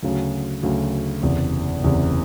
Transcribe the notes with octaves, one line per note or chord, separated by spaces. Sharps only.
D2 C#3 F#3
D2 C#3 F#3
F#1 E2 C3
F#1 E2 C3